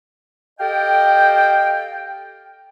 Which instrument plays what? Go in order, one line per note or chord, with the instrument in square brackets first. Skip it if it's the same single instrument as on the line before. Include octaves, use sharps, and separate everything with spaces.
[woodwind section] G4 A4 D#5 F5 G5